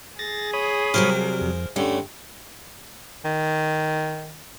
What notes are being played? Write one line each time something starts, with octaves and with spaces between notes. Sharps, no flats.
G#4 A6 A#6
C#5 B5 D#6
C3 F#3 G3 A#4 C5 F5
F2
G2 D3 A3 C#4
D#3